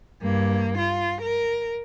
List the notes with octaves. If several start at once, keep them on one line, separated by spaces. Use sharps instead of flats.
G2 A#3
F4
A#4